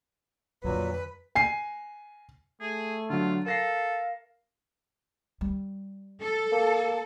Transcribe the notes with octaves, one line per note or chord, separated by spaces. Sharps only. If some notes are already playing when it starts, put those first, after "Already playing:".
F2 A#2 D3 F#3 B4
G#5 C7
A3 G#4
D3 F#3 F4
A4 A#4 F5 A#6 C7
G3
A4
A#3